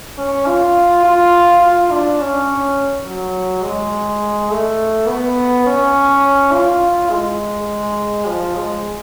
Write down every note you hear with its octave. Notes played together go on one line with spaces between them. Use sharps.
C#4
F4
F4
F4
D4
C#4
F#3
G#3
A3
B3
C#4
F4
G#3
F3
G#3